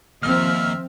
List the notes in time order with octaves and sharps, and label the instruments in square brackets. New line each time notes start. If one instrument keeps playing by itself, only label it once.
[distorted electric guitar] D#2 [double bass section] F3 C4 [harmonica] E5 [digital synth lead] F6